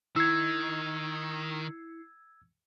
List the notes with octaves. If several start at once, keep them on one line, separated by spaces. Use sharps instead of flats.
D#3 E4 E6 G#6 C7 C#7